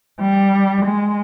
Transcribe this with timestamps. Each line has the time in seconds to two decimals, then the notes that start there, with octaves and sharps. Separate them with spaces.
0.20 G3
0.85 G#3